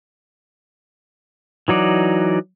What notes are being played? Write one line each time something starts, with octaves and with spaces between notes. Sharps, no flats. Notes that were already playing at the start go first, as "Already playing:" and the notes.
E3 F#3 D#4 D5